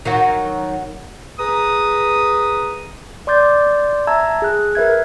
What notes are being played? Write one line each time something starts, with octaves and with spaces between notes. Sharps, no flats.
D#3 F#3 F#4
G#4 B4 A#5 D#6
D5 C6 D6 G6 A6
E5 A5 A#5 E6 G#6
G#4 F#6
A#4 B4 E5 G#6